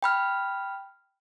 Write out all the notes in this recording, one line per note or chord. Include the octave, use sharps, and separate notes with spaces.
G5 B5 F6